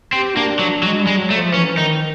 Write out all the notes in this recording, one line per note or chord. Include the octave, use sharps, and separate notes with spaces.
C4 G4
A#3 D4
F#3
F#3 G#3
G3
G#3
F#3
A3
F3
E3 C#4
D#3 D#4